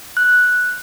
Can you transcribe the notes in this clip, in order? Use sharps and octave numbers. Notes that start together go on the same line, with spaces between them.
F#6